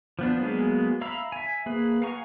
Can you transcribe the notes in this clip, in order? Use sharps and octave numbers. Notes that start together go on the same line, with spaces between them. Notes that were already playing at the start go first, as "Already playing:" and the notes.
F3 B3 D4
F#3 G#3 A#3 B3 G#4
E5 F5 A#5 B5 E6
E5 G#5
A#3 G#4 B4
F5 F#5 G#5 A#5 C#6